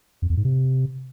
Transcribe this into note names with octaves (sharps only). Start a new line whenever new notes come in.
F2
E2
G#2
C3